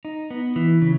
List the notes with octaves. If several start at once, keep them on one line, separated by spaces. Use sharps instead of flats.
D#4
B3
E3
C#3